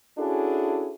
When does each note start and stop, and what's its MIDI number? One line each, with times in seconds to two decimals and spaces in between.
0.18 0.93 61
0.18 0.93 62
0.18 0.93 64
0.18 0.93 66
0.18 0.93 68
0.18 0.93 69